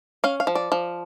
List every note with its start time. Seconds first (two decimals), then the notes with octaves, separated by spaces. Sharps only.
0.24 C#4 F5
0.40 F5
0.47 F3
0.55 D5
0.72 F3